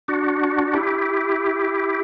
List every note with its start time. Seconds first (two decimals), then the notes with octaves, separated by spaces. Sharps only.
0.08 D4 F#4
0.67 F#4
0.74 E4 G4